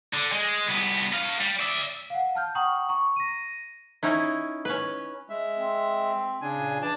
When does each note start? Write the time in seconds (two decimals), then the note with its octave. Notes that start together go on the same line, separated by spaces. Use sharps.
0.13 D3
0.32 G#3
0.68 C2 B3
1.13 B4 F5
1.41 G3
1.59 D5 E5
2.10 F5 F#5
2.35 A5 F6 G6
2.55 F#5 G5 A#5 C#6 D#6 F#7
2.89 A#5 C#6
3.16 A#6 D#7
4.03 C#4 D#4 E4
4.65 C#4 B4
5.30 G#3 E5
5.57 C4
6.42 C#3 D4 G#5
6.57 A#2
6.82 E3 D4 D5 A5